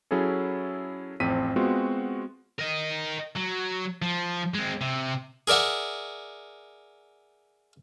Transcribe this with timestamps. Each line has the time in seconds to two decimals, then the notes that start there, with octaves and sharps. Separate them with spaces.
0.11 F#3 C#4 E4 G#4 A4
1.20 A1 F2 C4 B6 D#7
1.56 G#3 B3 C4 F4 F#4
2.59 A#4 D#5
3.36 F#3
4.02 F3
4.55 G#3 C4
4.81 C3
5.47 G#4 A#4 D5 E5 F#5